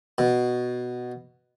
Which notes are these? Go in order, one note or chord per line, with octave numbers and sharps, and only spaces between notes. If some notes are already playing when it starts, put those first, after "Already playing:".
B2